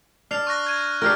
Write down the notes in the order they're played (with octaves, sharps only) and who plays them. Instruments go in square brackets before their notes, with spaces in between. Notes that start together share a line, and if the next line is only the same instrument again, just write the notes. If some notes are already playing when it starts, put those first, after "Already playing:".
[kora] D4 [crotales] F6 C7 F7
[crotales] C#6 F#6 A#6
G#6 D#7
[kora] D4 G4 A#4 [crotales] F6 C7